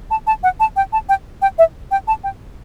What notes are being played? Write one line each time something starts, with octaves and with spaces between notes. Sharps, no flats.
A5
A5
F#5
A5
G5
A5
G5
G5
E5
G5
A5
G5